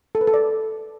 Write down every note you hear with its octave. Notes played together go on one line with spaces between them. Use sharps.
A4
B4
A4
D5